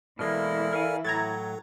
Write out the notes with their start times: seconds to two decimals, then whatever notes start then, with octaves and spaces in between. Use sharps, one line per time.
0.19 B2 E3 G#3 A#3 E4 A4 D5 F6
0.73 A#4 F5 G#5
1.04 A2 F#3 A4 A#5 G#6 A6